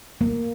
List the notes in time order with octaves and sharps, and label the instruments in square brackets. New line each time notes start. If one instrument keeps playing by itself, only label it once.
[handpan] A#3